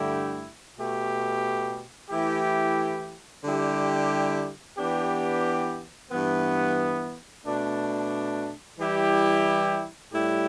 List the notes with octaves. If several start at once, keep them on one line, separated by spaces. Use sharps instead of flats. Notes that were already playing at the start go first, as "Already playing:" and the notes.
Already playing: G2 D3 A3 E4 G4
B2 A3 G4
E3 A3 E4 G4
D3 G3 E4 G4
E3 B3 D4 G4
G2 E3 B3
B2 A3 D4
E3 G3 E4 G4
A2 G3 E4 G4